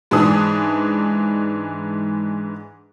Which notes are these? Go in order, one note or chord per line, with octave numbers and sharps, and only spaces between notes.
G#2 E3 D4 D#6